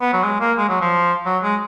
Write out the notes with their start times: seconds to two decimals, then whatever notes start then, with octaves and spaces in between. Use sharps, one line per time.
0.01 B3
0.13 F#3
0.24 G#3
0.40 A#3
0.58 G#3
0.69 F#3
0.81 F3
1.26 F#3
1.43 G#3